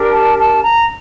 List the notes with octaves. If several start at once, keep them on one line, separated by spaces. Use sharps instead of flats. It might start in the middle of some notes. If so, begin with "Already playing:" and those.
Already playing: D4 G4 A#4
A5
A5
A#5